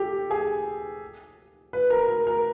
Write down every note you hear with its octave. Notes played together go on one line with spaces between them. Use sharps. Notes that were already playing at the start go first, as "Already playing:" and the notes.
Already playing: G4 A4
G#4
B4
A#4
A#4
A#4